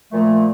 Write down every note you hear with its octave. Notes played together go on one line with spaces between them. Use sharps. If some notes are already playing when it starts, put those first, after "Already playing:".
A#2 F3 A3